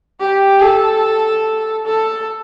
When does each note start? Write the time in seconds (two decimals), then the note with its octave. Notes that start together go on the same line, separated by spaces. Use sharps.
0.20 G4
0.61 A4
1.86 A4